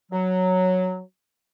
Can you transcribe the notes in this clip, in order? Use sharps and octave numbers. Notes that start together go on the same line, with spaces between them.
F#3